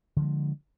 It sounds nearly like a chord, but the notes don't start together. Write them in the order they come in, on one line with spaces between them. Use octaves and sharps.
D3 F3 G#3